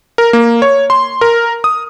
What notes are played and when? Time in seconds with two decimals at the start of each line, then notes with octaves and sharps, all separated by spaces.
0.18 A#4
0.33 A#3
0.62 C#5
0.90 C6
1.21 A#4
1.64 D#6